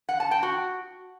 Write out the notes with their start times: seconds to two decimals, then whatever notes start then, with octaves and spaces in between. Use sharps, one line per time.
0.09 F#5
0.20 A5
0.31 G5
0.43 F#4